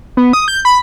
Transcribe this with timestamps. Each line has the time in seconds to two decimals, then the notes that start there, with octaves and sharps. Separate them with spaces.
0.17 B3
0.33 D#6
0.48 G6
0.65 B5